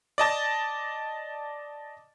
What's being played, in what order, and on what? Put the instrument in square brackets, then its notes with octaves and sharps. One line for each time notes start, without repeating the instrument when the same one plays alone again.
[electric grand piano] D5 D#5 A5 A6